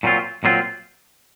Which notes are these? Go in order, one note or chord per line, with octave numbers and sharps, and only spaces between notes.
A#2 F#3 C4 F4
A#2 F#3 C4 F4